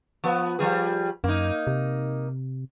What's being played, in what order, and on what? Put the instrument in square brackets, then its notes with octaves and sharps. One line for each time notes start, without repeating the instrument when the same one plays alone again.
[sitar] F3 B3
F3 G3 G#4
[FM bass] F#2 [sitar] A#3 D#4
[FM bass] C3